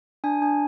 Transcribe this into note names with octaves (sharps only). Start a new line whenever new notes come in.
D4 G#5
D4 G#5